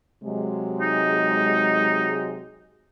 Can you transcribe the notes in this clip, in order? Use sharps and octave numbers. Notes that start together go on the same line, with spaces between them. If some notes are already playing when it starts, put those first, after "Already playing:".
C3 F#3 G#3
D#4